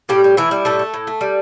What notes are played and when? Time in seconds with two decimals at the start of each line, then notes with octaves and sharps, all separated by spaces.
0.09 A2 G3 G4
0.24 G3
0.37 A2 E3 E4
0.51 G3
0.65 A2 A3 A4
0.79 A3
0.94 A2
1.07 A3
1.21 G3